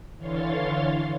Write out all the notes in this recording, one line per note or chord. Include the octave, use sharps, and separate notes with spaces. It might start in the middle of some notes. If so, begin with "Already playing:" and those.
D3 E3 C#5 F5 C6 A6